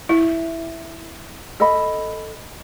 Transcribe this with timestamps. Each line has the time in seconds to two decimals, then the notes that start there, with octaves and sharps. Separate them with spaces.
0.09 E4 E5
1.60 A4 D#5 B5